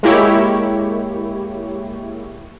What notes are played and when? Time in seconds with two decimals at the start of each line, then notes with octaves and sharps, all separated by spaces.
0.03 G#3 A#3 E4 G4 C#5